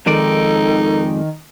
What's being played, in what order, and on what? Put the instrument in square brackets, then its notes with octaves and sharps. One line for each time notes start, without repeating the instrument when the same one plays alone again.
[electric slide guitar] F2 G#3 D5 [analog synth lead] D#3 [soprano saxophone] D#4 [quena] A4